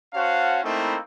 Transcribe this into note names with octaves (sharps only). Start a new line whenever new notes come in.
C#4 F#4 C5 F5 F#5 A5
A3 A#3 C4 D#4 E4